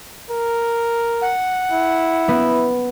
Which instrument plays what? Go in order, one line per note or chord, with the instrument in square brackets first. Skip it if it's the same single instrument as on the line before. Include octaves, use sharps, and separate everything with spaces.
[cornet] A#4
[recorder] F#5
[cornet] E4
[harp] B3